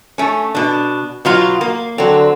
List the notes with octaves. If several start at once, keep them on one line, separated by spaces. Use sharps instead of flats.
A3 C#4
B2 D4
B2 F#3 F4
A#3
D3 F#3 C4